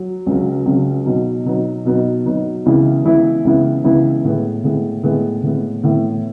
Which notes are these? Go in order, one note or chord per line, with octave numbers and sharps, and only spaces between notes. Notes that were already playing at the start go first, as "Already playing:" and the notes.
Already playing: F#3
C#2 C#3 F#3
C#2 C#3 F#3
B2 F#3 B3 D#4
B2 F#3 B3 D#4
B2 F#3 B3 D#4
B2 F#3 B3 D#4
C#2 C#3 E3 B3 E4
C#2 C#3 E3 B3 E4
C#2 C#3 E3 B3 E4
C#2 C#3 E3 B3 E4
A2 G#3 B3
A2 G#3 B3
A2 G#3 B3
A2 G#3 B3
A2 E3 B3